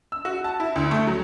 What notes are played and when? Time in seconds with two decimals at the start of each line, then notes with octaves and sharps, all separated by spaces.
0.12 E6
0.25 F#4
0.44 A5
0.60 E4
0.76 D2
0.91 A3
1.07 F#3